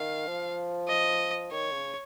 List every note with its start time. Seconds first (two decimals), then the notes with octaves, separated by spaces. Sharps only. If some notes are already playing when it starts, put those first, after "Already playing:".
Already playing: D#3 F5
0.27 F3
0.88 D#5
1.51 D#3 C#5
1.72 C#3